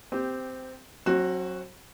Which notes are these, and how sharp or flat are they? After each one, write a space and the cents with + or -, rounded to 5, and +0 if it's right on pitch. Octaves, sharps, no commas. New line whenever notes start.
C4 -15 G4 +0
F#3 +0 C4 +40 F#4 +0